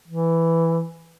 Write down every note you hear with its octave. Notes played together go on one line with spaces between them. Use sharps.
E3